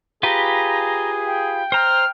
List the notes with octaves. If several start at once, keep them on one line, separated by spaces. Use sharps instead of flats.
F4 G4 G#4 B4 A#5
G5
C5 A#5 F6